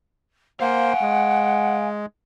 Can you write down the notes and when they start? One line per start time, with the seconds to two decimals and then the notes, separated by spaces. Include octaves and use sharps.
0.60 A#3 C5 F5 F#5 G#5
1.01 G#3